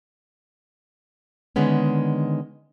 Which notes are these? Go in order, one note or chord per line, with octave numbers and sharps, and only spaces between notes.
D3 D#3 G#3 B3 C#4